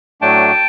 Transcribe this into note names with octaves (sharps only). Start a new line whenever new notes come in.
A2 F#3 A3 D4 G5 A5